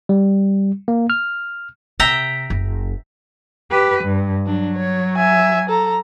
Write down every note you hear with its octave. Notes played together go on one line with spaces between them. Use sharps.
G3
A#3
F6
C3 E5 G5 A#5
F#1
G4 B4
G2
F#3 D4
C#5
E5 G#5
A4 A#5